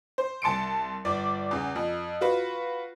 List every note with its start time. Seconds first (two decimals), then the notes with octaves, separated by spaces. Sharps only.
0.18 C5
0.42 C2 A5 C6 C#7 D7
1.05 G1 D5
1.51 E2 C#3
1.75 F2
2.21 F4 F#4 B4